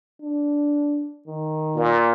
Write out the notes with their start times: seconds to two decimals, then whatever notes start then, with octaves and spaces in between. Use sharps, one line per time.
0.22 D4
1.28 D#3
1.75 A#2